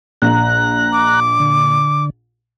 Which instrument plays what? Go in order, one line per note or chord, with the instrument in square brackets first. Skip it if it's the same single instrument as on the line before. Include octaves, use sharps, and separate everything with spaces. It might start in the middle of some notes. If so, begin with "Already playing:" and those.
[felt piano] A#1 [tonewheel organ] A#5 F#6
[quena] D6
[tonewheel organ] D3